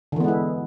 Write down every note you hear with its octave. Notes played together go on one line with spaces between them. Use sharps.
D3 E3 G#3 B3 E4